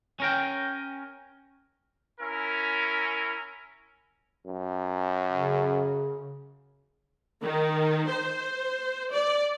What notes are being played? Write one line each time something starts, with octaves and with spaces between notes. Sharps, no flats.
C#4 A#4 G5
C#4 E4 A#4
F#2
C#3
D#3
C5
D5